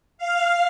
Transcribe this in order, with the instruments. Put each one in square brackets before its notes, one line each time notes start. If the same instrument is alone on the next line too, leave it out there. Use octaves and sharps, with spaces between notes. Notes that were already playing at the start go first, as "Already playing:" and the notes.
[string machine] F5